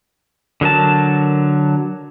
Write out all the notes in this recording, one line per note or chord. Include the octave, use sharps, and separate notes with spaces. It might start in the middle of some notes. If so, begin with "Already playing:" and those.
D3 F#3 A#4 A5